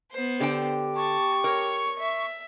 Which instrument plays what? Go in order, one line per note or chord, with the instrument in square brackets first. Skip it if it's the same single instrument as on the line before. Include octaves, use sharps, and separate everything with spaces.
[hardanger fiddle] B3 C5
[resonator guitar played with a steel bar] D3 G5 [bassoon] G4
[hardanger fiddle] A5 [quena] C#6
[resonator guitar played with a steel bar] A#4 [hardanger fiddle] C#5
[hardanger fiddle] E5